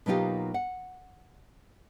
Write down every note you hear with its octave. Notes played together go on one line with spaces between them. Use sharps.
B2 F#3 A#3 D#4 F4 G4
F#5